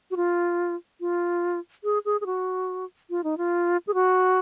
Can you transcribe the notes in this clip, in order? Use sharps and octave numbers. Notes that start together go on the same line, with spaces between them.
F#4
F4
F4
G#4
G#4
G#4
F#4
F4
D#4
F4
G#4
F#4